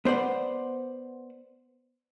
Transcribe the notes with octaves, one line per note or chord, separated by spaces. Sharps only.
B3 C5 D5 F#5